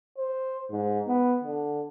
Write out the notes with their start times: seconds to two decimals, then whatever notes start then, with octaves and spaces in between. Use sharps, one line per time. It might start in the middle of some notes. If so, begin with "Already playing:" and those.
0.18 C5
0.71 G#2
1.07 B3
1.44 D3